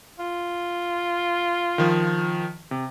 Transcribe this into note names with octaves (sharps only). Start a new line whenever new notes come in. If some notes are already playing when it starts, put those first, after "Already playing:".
F4
D#3 F3
C3